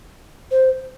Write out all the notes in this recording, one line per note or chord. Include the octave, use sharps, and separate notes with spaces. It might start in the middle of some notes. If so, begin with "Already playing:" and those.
C5